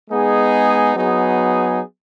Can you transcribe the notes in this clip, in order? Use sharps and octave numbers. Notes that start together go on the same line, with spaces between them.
G#3 B3 D#4 G#4
F#3 B3 D#4 G#4